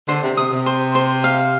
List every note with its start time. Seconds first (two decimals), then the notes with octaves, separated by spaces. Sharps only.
0.08 D3 C5
0.23 C3
0.37 C3 D#6
0.52 C3
0.66 C5
0.95 C5
1.24 F5